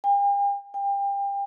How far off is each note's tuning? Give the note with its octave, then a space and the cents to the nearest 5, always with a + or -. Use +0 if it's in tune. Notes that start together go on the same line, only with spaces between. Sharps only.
G5 +45
G5 +30